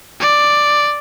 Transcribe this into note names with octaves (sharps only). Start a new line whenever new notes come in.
D5